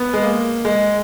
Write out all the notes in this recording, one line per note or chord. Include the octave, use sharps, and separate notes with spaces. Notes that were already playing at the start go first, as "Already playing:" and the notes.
Already playing: B3
G#3
A#3
G#3